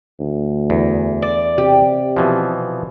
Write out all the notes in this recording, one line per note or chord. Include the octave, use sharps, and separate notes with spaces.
D2
E2
D5
C3 G4
B2 E3 F3